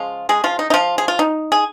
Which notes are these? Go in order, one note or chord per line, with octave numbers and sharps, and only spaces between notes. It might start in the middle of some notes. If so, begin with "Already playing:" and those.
Already playing: C#3 F3 G#3 F4
G#3 G#4
F3 F4
D#4
D#4
F3 F4
G#4
F4
D#4
G#4